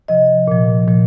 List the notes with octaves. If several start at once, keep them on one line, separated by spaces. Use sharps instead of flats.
C3 F3 D#5
A#2 F3
A#2 F3